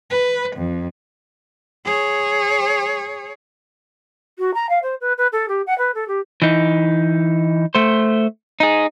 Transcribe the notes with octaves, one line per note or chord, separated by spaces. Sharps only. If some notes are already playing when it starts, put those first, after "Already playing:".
B4
F2
G#4 C#5
F#4
A#5
F5
C5
B4
B4
A4
G4
F#5
B4
A4
G4
E3 D#4
A3 C5
D#4 G#4